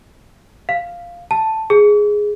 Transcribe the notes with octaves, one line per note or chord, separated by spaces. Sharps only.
F5
A5
G#4